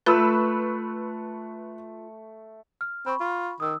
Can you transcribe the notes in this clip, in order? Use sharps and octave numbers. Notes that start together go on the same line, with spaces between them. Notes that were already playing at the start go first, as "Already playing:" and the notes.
A3 F4 B4 E6
F6
C4 B5 C#6
F4
D#3 D#6 E6